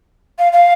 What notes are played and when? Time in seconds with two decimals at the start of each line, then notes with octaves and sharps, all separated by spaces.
0.39 F5
0.53 F5